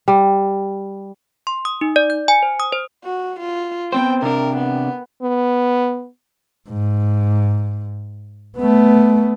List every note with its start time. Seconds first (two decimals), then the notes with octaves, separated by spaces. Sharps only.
0.08 G3
1.47 C6
1.65 D#6
1.81 D#4
1.96 D5
2.10 G6
2.28 G#5
2.43 C5
2.60 D#6
2.73 C5
3.04 F#4
3.39 F4
3.93 B3 C4 C5 G5
4.22 C3 D4 A#4
4.56 B3
5.22 B3
6.69 G#2
8.58 A3 B3